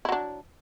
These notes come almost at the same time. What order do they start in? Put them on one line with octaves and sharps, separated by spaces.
E4 F#3 D4